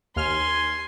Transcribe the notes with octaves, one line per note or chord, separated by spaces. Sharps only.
D#2 G#5 C6 F6